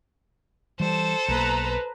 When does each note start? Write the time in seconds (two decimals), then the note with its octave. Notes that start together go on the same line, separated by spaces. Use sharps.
0.80 E3 G3 A4 C5
1.28 B1 A#3 B4 A#5